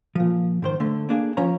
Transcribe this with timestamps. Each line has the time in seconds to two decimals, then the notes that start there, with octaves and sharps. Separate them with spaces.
0.15 A#2 F3
0.62 G#2 D#3 C5
0.80 D3 A3
1.09 A#3 D4 G#4
1.37 F3 C#4 C#5 A#5